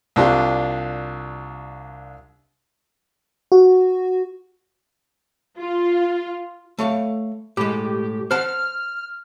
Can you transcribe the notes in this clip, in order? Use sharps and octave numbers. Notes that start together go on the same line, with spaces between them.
C2 D4 F4 G4
F#4
F4
A3 C#5 F5
A2 G#3 G4
C5 F#5 A5 F6